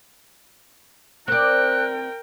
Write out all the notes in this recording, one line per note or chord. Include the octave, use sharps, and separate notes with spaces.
C4 A#4 D5 G5 F#6